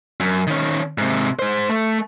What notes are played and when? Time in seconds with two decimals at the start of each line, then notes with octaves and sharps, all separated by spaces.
0.20 F#2
0.47 D#3 C#4
0.98 G#2 C3
1.39 G#3 C5
1.69 A3